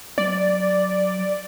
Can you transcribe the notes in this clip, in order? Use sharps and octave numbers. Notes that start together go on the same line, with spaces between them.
F#3 D5